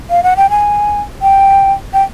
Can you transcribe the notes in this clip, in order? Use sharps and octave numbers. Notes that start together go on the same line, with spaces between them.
F5
F#5
G5
G#5
G5
G5